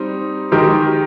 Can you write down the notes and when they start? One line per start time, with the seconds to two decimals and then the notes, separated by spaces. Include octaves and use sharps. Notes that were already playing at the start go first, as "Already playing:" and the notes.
Already playing: G3 C4 D#4
0.52 D#3 G#3 D#4 G4 A#4